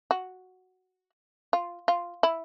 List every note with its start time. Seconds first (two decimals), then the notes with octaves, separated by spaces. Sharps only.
0.11 F#4
1.53 F4
1.88 F4
2.23 E4